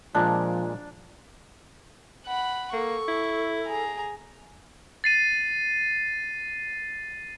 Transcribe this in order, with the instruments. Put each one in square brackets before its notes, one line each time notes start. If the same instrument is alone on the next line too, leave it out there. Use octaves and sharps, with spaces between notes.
[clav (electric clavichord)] A#2 G#3 [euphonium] F3 [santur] D4
[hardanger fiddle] F#5 B5
[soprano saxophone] A#3 [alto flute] A4 [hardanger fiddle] C#6
[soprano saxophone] E4
[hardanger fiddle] G#4 A#5
[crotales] A6 C7 D#7